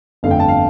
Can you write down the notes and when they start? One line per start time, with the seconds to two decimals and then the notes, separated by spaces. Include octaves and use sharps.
0.23 G1 F2 D3 A3 F5
0.31 G5
0.40 A5
0.48 F5